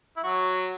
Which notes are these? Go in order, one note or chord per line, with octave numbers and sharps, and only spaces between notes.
E4
F#3 F#4